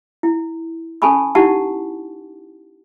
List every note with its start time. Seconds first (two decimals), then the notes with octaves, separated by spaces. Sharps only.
0.23 E4
1.02 C#4 A4 G#5 A5 B5 C#6
1.35 D#4 E4 G4 F#5 A5 C#6